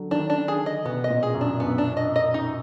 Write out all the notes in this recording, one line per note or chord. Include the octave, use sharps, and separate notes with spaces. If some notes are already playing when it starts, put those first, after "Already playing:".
Already playing: D3 F#3
D#3 D4
D4
D#3
G#4
D3
D#5
B2 B3
D#5
A#2
G#4
F#2
D4
F#2 B3
D4
D#5
D#5
D#4